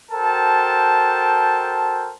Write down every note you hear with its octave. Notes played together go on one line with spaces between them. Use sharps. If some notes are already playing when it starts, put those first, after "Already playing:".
F#4 A4 A#4 C5 G5 A5